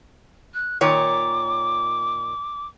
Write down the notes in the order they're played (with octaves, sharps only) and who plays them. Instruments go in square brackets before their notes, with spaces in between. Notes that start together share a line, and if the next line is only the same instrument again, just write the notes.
[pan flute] F#6
[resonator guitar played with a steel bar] A#2 D#3 C#5 [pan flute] D6